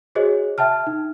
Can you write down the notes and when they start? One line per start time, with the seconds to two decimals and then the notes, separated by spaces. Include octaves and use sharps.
0.15 F#4 G#4 C5 C#5 D#5
0.58 E5 G5 A5 F6
0.87 D#4